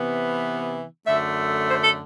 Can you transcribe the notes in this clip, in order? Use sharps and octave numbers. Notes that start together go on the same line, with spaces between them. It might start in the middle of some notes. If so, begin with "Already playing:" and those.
Already playing: C3 E3 B3
F#2 D3 A3 E5
C5
A4